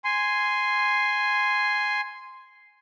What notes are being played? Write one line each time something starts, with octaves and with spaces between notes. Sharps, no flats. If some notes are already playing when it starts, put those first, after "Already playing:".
G#5 C6